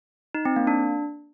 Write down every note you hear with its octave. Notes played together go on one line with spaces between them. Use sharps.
D#4
C4
A#3
D4